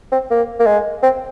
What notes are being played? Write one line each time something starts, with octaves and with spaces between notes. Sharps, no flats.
C4
A#3
A#3
G#3
C4